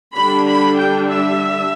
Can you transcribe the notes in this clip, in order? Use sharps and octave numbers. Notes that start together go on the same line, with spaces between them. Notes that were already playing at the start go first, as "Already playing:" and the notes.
D3 G3 D4 B5
B5
G5
E5